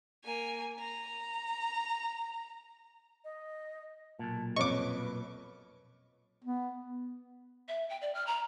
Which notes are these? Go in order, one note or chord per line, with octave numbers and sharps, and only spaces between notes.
A#3 G#5
A#5
D#5
B1 A#2 A5
F2 C#4 B4 D#5 C#6 D6
B3
E5
G5
D5
F6
A#5